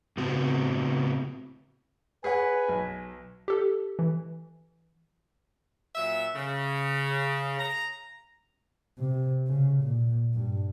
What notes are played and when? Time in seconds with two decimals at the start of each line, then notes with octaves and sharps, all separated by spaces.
0.17 A2 C#3 B3 C4 F#4
2.24 G#4 B4 C#5 F#5 G#5
2.68 B1
3.48 G4 A4
3.99 E3
5.95 A#2 F#3 E5
6.35 C#3
7.58 A#5
8.99 C3
9.47 C#3
9.82 A#2
10.34 G2